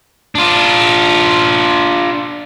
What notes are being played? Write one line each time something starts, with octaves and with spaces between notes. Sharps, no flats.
D4 F4